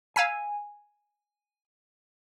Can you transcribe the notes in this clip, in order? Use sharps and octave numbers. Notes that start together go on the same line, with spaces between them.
F5 G#5 E6 B6